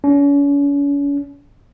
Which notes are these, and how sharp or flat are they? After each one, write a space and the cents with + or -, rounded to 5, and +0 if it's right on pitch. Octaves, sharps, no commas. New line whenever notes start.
C#4 +40